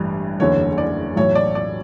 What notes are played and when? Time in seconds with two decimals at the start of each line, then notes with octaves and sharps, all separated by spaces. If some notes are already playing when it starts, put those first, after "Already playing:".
Already playing: A1 G2 E3
0.40 F#1 E2 D3 C#5
0.78 D5
1.16 B1 A2 E3 C#5
1.35 D5
1.55 D5